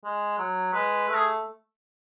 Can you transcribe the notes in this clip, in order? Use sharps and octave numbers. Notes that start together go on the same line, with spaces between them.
G#3
F#3
G#3 B4
A3
G#4